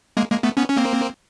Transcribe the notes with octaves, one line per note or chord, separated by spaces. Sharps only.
G#3 A#3
G#3 A#3
A3 B3
B3 C#4
C#4
A#3 C4